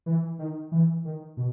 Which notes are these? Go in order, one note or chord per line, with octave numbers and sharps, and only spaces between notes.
E3
D#3
E3
D#3
B2